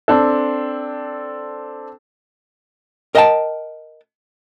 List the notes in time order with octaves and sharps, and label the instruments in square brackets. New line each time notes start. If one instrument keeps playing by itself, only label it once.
[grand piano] C4 D4 A4
[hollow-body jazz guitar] A#4 D#5 E5 F#5 G5 A5